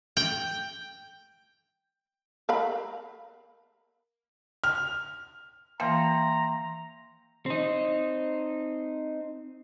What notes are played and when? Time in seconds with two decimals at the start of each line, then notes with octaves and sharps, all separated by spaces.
0.17 G5
2.49 A#4 F5 B5
4.64 F6
5.80 E3 F3 A#3 E5 G5 A#5 C6
7.46 C4 D#4